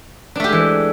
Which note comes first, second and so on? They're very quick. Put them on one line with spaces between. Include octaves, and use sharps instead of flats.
D4 A3 G4 G#3 E3